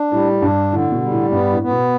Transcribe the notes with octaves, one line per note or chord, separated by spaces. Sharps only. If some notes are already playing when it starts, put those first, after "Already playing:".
Already playing: D4
A2 G3
G2 D4
A2 D3
B2
G3
A2
G2 B3
A2
B3
B2